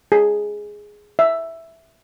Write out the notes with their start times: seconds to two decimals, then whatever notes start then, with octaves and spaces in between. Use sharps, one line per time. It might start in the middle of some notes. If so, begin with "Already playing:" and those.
0.12 G#4
1.19 E5